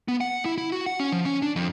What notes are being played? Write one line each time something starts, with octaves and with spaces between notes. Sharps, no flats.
B3
F#5
E4
E4
F#4
F#5
C#4
F3
C#4
D4
F2